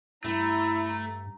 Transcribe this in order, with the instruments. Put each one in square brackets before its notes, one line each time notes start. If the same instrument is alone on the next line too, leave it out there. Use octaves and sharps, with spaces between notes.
[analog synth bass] G2 [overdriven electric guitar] A3 [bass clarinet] E4 [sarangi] A#5